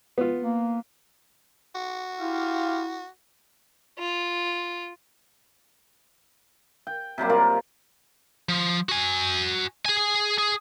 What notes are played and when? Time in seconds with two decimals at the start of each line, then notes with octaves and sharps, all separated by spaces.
0.18 B3 F4
0.42 A#3
1.75 F#4
2.20 E4 F4 G4 F5
3.98 F4
6.87 G5
7.18 C3 F#3 G3 A#3
7.30 F4 A#4 D5
8.49 F3
8.89 F#4 G#5
9.86 G#4 G#5
10.38 G#4